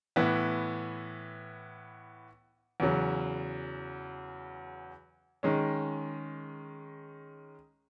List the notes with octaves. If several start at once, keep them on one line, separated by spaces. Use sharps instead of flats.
A2 E3 B3
E2 C#3 F#3
D#3 G#3 C#4